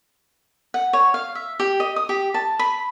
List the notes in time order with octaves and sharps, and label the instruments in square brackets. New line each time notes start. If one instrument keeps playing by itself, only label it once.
[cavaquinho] F#5
C#5
F5
E5
G4
D#5
D#6
G4
A5
B5